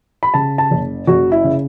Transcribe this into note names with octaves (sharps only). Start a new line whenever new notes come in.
B5
C#3 A5
A5
F#1
F#1 F#4
E4
C#3